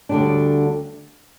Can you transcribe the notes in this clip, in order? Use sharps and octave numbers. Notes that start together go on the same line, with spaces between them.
D2 D3 G3 D4